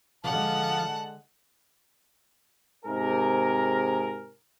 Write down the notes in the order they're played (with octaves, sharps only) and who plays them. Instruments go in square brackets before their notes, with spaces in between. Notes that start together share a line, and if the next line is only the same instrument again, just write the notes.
[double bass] D3 G#3 [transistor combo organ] F3 [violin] F#5 [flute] A5
[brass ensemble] G#2 C3 G#4 A#4